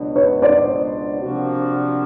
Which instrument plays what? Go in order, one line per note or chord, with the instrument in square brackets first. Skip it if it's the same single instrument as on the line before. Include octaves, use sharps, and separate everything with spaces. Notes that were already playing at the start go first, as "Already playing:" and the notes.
Already playing: [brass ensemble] C#2 B2 F#3 B3 D4
[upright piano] B4 C#5
C5 D5
[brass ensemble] C3 F3 A#3 D4 F#4